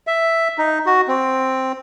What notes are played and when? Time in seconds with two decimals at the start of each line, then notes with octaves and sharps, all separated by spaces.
0.07 E5
0.58 D#4
0.86 F#4
1.08 C4